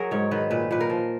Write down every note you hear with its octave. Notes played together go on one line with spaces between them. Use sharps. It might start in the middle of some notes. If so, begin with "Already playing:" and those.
Already playing: F#3 F#4 G#4 A#4
G#2 C#5
D#3 B4
A#2 B4
A#2 B4
A#4
F3